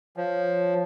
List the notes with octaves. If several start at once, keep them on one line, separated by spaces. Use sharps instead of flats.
F3 C#5